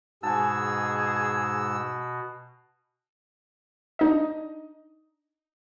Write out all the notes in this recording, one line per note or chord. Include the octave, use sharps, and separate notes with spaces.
G#2 B2 G#4 G#5 A5 E6
D4 D#4 D#5